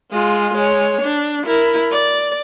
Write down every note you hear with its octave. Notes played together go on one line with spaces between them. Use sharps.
G#3 F4
G#3 C#5
D4
E4 A#4
D5